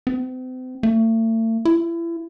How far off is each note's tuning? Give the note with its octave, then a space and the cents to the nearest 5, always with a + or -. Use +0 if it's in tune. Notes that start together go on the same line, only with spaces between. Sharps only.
C4 -40
A3 +40
E4 +30